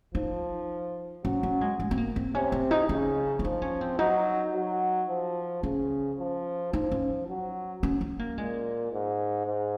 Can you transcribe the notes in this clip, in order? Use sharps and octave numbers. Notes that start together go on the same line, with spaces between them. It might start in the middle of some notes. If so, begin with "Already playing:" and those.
F3 D#4
F#3 C#4
C#4
G#3
G#3
C4
A#3
C4
C3 C#4
C4
D#4
C#3 C#4
C#4
F3 D#4
C#4
C4
F#3 D#4
F#3
F3
C#3 C#4
F3
F3 D#4
C#4
F#3
C#4
C#4
A#3
A#2 G#3
G#2
G#2